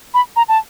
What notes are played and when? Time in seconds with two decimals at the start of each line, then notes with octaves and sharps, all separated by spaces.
0.14 B5
0.36 A#5
0.48 A5